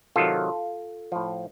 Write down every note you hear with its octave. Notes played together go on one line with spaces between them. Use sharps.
C3 D#3 F#3 F4 A4
A2 F3